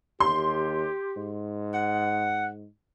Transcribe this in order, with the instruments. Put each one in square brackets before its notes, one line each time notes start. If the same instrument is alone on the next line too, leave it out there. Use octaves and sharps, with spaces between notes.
[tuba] D#2 [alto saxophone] G4 [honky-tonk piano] C6
[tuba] G#2
[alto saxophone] F#5